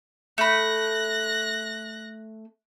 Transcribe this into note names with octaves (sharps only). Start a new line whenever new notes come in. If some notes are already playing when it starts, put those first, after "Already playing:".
A3 B5 F#6 A#6